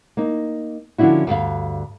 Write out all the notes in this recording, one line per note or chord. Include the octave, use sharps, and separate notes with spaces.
A#3 D#4
D3 F3 C#4 D4 E4 F#4
D2 G2 F5